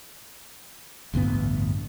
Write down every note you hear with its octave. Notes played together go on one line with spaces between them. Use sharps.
A1 D2 G2 B3